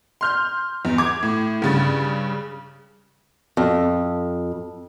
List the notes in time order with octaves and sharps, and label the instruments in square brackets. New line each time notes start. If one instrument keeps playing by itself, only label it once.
[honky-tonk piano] C6 F6 G6
E2
D6 G#6
A2
G2 C#3 A6
[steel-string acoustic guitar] F2